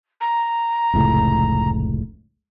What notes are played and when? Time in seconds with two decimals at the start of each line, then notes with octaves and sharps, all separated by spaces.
0.20 A#5
0.94 F1 C#2 A2